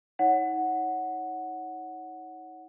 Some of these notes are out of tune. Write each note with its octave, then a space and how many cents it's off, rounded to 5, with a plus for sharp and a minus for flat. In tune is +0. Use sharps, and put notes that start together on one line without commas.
D#4 +35 C#5 +0 F#5 +0